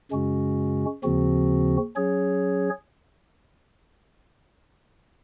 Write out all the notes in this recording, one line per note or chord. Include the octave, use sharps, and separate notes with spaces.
F#2 C#3 G#3 C#4 F#4
D#2 C#3 F3 C4 F#4
F#3 C#4 G#4 C#5